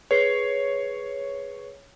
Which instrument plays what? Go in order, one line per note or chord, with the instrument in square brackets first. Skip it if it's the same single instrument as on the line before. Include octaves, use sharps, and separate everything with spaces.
[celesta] G#4 B4 C7 [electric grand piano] C#5